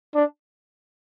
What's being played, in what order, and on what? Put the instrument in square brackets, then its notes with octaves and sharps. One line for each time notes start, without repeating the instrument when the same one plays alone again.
[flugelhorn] D4